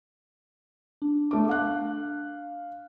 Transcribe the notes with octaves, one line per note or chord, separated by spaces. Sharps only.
D4
A3 D6
F5 F#6